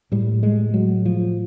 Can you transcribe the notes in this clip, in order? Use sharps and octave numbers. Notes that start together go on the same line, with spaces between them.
A2 G3
G#3
F#3
F3